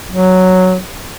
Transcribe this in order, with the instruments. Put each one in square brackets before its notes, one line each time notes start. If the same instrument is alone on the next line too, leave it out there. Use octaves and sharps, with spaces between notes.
[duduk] F#3